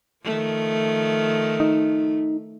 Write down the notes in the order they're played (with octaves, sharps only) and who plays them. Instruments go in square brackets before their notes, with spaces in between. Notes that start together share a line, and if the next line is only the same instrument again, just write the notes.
[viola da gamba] D#3 F3 A3
[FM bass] D#4